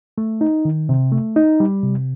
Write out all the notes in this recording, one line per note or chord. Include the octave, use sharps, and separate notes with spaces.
A3
D#4
D#3
C3
A3
D#4
G3
C3